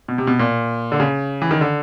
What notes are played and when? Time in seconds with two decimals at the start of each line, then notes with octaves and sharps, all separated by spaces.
0.08 B2
0.18 C3
0.27 B2
0.39 A#2
0.92 D3
1.00 C#3
1.42 E3
1.51 D#3
1.61 D3